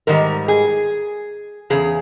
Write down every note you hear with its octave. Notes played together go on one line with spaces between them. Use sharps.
G#2 D#3 G3 A#4
G#4
E2 C#3 G#4